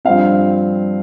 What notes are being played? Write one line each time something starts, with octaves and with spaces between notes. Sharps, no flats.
G2 F3 C4 F5